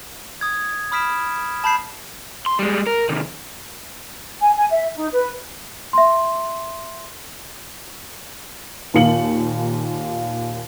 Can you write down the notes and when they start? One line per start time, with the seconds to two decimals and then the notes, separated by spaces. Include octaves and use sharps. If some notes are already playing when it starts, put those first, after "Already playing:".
0.41 D#6 G#6
0.92 B5 D#6 F6 B6 D7 E7
1.64 A5 B5 G6 C7 E7
2.46 C6
2.59 G3 G#3
2.87 A#4
3.09 C3 D#3
4.41 G#5
4.56 G#5
4.71 E5
4.95 D#4
5.13 B4
5.93 E5 C6
8.94 D#2 A#2 A#3 C#7 F#7